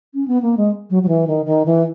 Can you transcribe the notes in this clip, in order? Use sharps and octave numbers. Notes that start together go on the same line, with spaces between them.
C#4
B3
A#3
G#3
F#3
F#3
E3
D#3
D#3
E3